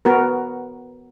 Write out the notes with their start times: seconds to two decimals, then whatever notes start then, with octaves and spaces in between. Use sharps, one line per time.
0.05 B3 F#4 A#4